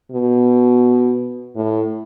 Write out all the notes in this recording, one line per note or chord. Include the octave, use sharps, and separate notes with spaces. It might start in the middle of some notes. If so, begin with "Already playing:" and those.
B2
A2